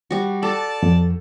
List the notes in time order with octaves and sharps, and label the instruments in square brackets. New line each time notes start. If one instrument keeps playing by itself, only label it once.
[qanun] G3 F#4
[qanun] A4 [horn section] D5 A5
[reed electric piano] F2